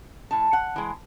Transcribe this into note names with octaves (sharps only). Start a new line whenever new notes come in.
A2 A5
F#5
E3 G#3